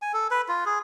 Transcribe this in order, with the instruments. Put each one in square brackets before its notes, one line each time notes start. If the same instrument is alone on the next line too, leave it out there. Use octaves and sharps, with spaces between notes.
[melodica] G#5
A4
B4
F4
G#4